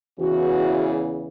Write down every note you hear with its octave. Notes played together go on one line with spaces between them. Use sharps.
E2 C#3 E3 F#4